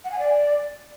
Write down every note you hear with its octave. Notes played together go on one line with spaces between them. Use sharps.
F#5
G#5
D5